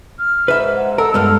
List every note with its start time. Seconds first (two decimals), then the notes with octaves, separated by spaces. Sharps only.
0.18 F6
0.48 G#2 B4 E5
0.76 F#5
0.98 A4 A#4 E6
1.14 G2 G#3 B3 F6